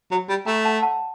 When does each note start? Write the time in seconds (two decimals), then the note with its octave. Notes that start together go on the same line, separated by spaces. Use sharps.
0.11 F#3
0.29 G3
0.46 A3 G5 A#5
0.64 F#5 A5
0.83 F#5 A5